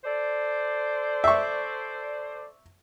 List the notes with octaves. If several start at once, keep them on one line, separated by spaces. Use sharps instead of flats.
A4 C5 D5
E5 C#6